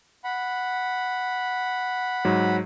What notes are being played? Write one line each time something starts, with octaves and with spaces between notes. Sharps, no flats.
F#5 B5
G#2 F#3